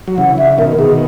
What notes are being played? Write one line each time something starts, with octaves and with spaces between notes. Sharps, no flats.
F#3
C#3 E3 F#5
C#3 E5
B2 D#3 A#4
B2 D#3 G#4